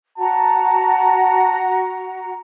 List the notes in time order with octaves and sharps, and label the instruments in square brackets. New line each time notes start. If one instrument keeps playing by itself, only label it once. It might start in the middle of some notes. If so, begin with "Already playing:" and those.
[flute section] F#4 F#5 A#5 [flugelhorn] A5